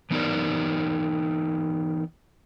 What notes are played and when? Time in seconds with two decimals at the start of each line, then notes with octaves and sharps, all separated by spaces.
0.11 E3 B3 D#4 G4 A#4 D5